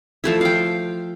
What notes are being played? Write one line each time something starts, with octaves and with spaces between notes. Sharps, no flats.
F3 A3 E4
F5 G5